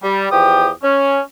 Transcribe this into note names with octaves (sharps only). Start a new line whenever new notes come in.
G3
E2 F3 G4 G5 D#6
C#4